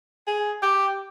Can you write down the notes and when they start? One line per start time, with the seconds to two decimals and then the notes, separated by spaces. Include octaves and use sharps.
0.27 G#4
0.62 G4